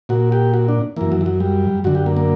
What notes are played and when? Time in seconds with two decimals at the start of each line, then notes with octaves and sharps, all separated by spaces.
0.09 A#2 F#4
0.32 G4
0.54 F#4
0.69 D4
0.96 F#2 E3 A#3
1.12 F#3
1.21 E3
1.26 F#3
1.40 G3
1.84 F#2 D3 F#4
1.95 G4
2.06 A#3
2.17 A#3